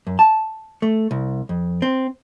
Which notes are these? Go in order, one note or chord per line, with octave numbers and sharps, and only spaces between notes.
F#2
A5
A3
C2
F2
C4